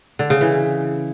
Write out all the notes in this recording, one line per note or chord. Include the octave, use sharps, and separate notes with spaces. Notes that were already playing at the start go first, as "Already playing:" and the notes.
D3
C#3
E3